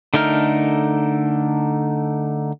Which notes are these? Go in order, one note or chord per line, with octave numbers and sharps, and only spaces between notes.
D3 A3 D#4 A#4 F6